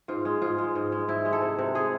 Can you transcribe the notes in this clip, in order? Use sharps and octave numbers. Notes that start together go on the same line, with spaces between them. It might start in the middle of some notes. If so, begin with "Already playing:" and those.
G#2 F4
G#3
G#2 F4
G#3
G#2
G#3
G#2 E4
G#3
A4
C3
C3
G#3 G#4